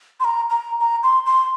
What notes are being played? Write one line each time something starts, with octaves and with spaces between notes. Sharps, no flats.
C6
A#5
A#5
A#5
C6
C6